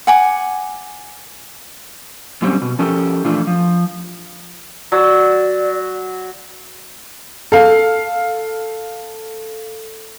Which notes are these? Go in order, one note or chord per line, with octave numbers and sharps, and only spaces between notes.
F#5 G#5 D6
F#2 A#2 D3 G3 C4 C#4
B2
F3 C#4 G4 A4 A#4
A#2 E3 F3 A3 D4 F4
F3
F#3 D5
A4 F5